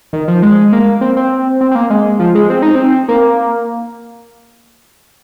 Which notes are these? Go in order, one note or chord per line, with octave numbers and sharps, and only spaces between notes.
D#3
F3
G#3
A#3
C4
C4
C4
C4
A#3
G#3
F3
G#3
C4
D#4
C4
A#3